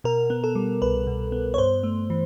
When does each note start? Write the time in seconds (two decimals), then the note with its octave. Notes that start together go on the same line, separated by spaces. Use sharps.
0.04 B2 A#4
0.30 B3
0.44 A4
0.55 G3
0.82 C2 B4
1.07 B2
1.32 B3
1.54 C#5
1.58 G2 C5
1.83 A3
2.10 E3